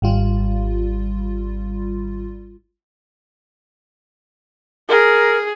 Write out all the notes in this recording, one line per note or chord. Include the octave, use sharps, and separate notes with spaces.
G#1 G3 F4
G#4 A#4